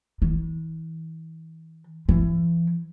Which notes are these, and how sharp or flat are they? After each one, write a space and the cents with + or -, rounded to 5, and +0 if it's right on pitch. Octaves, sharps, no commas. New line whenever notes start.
E3 -35
E3 +35